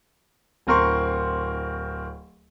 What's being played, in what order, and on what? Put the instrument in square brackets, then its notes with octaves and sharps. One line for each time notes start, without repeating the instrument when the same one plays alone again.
[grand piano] D1 C4 A#4 C6 C#6